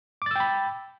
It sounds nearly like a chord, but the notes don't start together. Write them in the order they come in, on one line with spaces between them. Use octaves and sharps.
D6 A6 E6 G5 B5